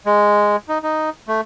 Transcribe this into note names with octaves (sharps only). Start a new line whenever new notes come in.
G#3
D#4
D#4
A3